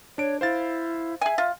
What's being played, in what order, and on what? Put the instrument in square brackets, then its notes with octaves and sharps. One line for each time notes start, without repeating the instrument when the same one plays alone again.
[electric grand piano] D4 D7 [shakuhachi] C#5
[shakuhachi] E4 [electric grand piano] C5 F5 A6
[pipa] G#4 G#5 [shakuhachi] E5
[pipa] F4